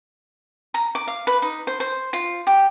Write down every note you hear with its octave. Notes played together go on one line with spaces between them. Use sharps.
A#5
D6
F5
B4
D#4
C5
C5
F4
G4